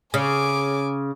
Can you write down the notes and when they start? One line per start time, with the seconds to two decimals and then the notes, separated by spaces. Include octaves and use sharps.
0.14 C#3 G#5 D6